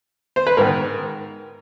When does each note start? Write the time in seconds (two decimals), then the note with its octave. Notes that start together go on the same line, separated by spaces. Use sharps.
0.36 C5
0.47 B4
0.57 G#2 D#3 A#4